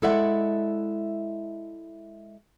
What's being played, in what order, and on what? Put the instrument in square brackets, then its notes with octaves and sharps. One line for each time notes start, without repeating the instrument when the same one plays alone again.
[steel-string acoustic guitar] G#3 E4 A4 D5 E5 F#5